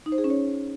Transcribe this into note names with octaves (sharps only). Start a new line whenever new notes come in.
D#4
C5
G#4
C#4
C#5